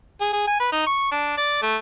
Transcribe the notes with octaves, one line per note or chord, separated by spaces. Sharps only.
G#4
G#4
G#5
B4
D#4
C#6
D4
D5
A3